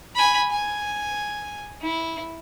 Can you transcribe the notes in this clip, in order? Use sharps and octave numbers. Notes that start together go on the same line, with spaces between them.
G#5 B5
G#5
E4